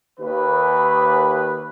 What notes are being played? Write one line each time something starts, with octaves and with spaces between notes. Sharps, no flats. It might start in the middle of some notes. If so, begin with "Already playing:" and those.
D#2 B4